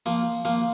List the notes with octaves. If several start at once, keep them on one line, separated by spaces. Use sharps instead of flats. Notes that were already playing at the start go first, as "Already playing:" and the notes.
F3 A#3
F3 A#3